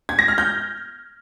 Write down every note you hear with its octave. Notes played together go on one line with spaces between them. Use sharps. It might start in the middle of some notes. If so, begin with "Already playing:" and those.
G#6
A#6
F6
G6